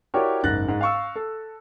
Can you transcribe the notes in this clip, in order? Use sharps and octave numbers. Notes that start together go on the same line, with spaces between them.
E4 F#4 G4 A#4 C#5 D5
F#1 G#2 F#6 A6 A#6
G#2
F5 C#6 E6
A4